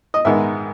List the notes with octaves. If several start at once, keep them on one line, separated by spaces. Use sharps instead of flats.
D#5
G#2 D#3 G#3 B3 D#4 E5